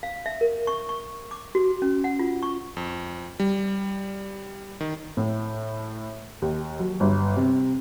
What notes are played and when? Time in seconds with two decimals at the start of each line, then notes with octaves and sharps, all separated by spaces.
0.03 F5
0.26 E5
0.41 A#4
0.67 C#6
0.89 C#6
1.31 D6
1.55 F#4
1.82 C#4
2.04 F#5
2.19 F4
2.43 C#6
2.77 F2
3.40 G3
4.81 D#3
5.17 A2
6.42 D#2
6.79 F#3
7.00 G1
7.37 C3